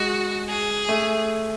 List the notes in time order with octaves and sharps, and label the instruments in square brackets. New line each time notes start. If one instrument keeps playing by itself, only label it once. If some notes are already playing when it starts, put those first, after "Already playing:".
Already playing: [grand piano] G#3 [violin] F#4
[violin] G#4
[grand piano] A3